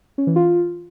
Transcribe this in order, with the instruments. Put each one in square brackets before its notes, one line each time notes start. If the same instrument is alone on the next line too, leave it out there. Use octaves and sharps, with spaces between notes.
[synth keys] C#4
E3
F4